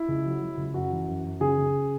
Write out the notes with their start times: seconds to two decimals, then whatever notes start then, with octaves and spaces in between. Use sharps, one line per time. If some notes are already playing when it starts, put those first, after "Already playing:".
Already playing: E4
0.08 C#2
0.25 F#3
0.42 F#3
0.57 C#2
0.74 F#2 F#4
0.92 E3
1.08 F#2
1.24 F#2
1.40 C#3 G#4
1.58 C#3